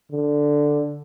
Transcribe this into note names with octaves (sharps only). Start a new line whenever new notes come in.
D3